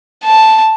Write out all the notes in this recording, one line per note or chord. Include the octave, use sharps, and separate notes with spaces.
A5